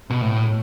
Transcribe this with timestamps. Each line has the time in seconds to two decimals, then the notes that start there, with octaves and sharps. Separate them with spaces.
0.10 B2
0.21 A2